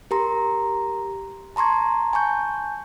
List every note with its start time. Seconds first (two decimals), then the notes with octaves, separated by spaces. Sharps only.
0.11 G4 A#4 A#5 C6
1.56 A5 A#5 C6 C#6 G#6
2.13 G#5 A5 C#6 G6